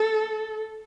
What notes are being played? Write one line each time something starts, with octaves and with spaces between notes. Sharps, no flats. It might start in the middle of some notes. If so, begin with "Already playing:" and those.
Already playing: A4